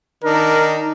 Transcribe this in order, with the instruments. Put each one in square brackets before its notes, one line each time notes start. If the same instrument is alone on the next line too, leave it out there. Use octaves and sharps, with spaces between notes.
[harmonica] D#3 D4 D#4 [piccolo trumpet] A#4